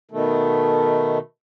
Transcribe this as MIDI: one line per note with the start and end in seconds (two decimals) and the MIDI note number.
0.11 1.18 47
0.11 1.18 51
0.11 1.18 57